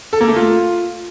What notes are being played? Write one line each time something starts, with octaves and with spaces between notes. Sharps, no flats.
A4
A#3
A3
F4